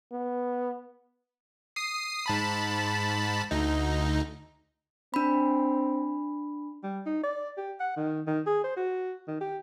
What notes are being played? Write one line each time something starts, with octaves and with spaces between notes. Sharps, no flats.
B3
D#6 C7
G#2 A5 B5
D2 D#4
C4 D4 B5
G3
D#4
D5
G4
F#5
D#3
D#3
G#4
C5
F#4
D#3
G4